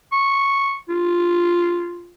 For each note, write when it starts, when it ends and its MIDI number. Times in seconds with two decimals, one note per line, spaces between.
0.12 0.77 85
0.89 2.14 65